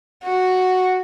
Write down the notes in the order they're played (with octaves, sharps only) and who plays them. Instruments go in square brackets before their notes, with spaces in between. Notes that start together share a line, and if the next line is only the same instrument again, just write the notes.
[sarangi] F#4